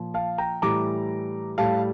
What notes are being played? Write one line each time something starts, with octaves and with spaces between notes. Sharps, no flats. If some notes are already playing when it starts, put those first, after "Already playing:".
Already playing: A#2 F3
F5 A5
G5 A#5
A2 E3 G3 A#5 D6
A2 G3 F5 A5